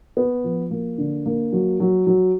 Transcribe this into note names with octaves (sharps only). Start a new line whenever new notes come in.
B3
F3
A#3
D3
A#3
F#3
F#3
F#3